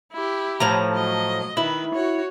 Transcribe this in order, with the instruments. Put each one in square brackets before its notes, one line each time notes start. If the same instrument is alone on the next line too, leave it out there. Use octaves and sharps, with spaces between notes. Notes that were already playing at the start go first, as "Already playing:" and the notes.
[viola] E4 G4
[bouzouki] A2 F3 A#5
[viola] F#3 D#5
[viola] D#3 B4 [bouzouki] E4
[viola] F#4 C#5